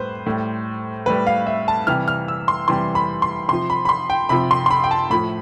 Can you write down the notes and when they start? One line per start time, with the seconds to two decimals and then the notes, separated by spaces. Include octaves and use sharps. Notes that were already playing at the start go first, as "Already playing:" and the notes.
Already playing: A2 G3 B4 C5
0.26 A2 G3
1.06 A2 G3 B4
1.27 F5
1.47 E5
1.68 A5
1.87 C3 E3 G3 F6
2.08 F6
2.28 E6
2.48 C6
2.68 C3 E3 G3 C6
2.95 B5
3.22 C6
3.49 C3 F3 C6
3.70 B5
3.85 B5
3.89 C6
4.10 G5
4.29 C3 F3 B5
4.51 C6
4.66 C6
4.71 B5
4.84 G5
4.91 A5
5.10 A2 F3 B5